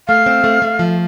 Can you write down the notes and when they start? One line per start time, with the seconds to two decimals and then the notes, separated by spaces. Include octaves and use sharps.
0.08 A3 F5
0.26 C4
0.44 A3
0.62 A3
0.79 F3